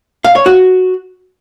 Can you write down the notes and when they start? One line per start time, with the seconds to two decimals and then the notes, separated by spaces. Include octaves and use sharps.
0.24 F5
0.35 C#5
0.46 F#4